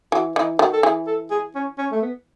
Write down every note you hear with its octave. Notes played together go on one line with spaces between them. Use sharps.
E3 F#4
E3 D#4
D#3 F#4
A4
E3 G#4
A4
G#4
C#4
C#4
A3
B3